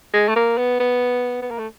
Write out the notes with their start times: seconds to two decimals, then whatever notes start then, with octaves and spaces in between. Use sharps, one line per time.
0.14 G#3
0.28 A3
0.36 A#3
0.58 B3
0.80 B3
1.42 B3
1.51 A#3
1.59 A3